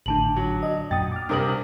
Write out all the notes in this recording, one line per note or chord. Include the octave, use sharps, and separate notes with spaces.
G#1 A2 D3 D4 A5 F#7
F#3
D5 D#5
F#2 A#2 G5 D#6 A6
D6 F6
C2 C3 D4 A#4 D6 D#6 F#7